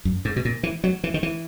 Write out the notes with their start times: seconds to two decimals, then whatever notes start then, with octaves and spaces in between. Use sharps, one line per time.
0.05 F#2
0.25 G#2
0.36 B2
0.45 A#2
0.63 E3
0.84 F#3
1.04 E3
1.14 D#3
1.23 E3